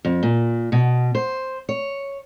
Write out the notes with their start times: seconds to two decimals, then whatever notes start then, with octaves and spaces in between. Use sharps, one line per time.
0.05 F2
0.23 A#2
0.72 B2
1.15 C5
1.69 C#5